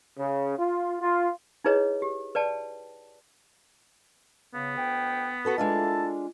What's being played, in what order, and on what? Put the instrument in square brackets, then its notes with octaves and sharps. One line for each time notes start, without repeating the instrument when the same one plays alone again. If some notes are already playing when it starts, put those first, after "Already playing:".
[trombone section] C#3
F4
F4
[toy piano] D#4 E4 G#4 B4 C#5 D#5
G4
B4 D5 G5 A5
[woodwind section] C#3 [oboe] B3
[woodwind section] D2 G5
[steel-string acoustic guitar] F#4 A4 B4
[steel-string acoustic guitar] G#3 D4 F4 [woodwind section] A#3 E4 A4 [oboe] A5